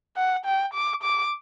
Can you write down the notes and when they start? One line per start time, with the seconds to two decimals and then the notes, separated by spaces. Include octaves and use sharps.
0.17 F#5
0.45 G5
0.74 D6
1.03 D6